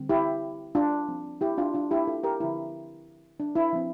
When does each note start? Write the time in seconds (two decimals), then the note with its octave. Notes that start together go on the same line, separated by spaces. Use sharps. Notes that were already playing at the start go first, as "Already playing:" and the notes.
Already playing: D3 G3 C4
0.10 E4 G4
0.75 D4 F4
1.08 F3 C4
1.41 E4 G4
1.58 D4 F4
1.74 D4 F4
1.91 E4 G4
2.07 F4 A4
2.24 G4 A#4
2.40 D3 F3 C4 E4
3.40 D4
3.55 E4
3.73 F3 C4